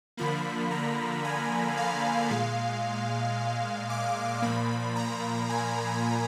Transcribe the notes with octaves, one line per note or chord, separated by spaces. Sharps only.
D3 F3 A#3 B5
A#5
G#5
F5
A#2 G#3 F5
D6
A#2 F3 A#3 B5
A#5
G#5